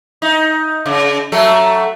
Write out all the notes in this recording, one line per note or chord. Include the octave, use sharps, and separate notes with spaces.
D#4
C#3
F#3 A3 A4